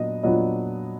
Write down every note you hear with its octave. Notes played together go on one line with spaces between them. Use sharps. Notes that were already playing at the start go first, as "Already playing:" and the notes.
Already playing: A#2 F#3 B3 D4 D#5
A#2 F#3 B3 D4 F4 D#5